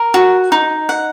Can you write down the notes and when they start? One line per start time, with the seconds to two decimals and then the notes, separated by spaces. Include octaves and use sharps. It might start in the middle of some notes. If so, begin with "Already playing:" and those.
Already playing: A#4
0.14 F#4
0.52 D#4
0.89 F#5